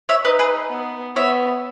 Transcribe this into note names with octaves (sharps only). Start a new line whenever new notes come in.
C#5 E5
D#4 B4 D#5
G#4 B4
B3
B3 C#5 E5